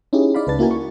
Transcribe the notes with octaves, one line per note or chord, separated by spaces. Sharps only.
C#4 D#4 E4 G4 G#4
D#4 D5 F5 B5
C#2 B4 D5 A5 A6
A#3 E4 F#4 A#4 G#5
C#6